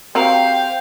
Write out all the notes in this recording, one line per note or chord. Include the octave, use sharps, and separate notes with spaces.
C4 F#4 G4 A#4 C5 F5 G5